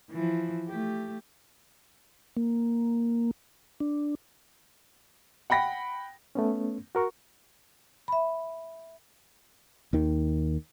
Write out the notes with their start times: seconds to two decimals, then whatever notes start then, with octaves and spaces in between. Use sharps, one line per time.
0.11 E3 F3
0.68 A3 G4
2.37 A#3
3.80 D4
5.50 F#5 G5 B5 A#6
6.35 A3 B3 C#4
6.95 F#4 A#4 C#6
8.08 E5 B5
9.93 D#2 D#3